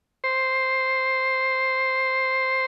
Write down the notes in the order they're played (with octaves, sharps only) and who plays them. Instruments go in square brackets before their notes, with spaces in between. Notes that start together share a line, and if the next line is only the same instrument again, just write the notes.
[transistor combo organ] C5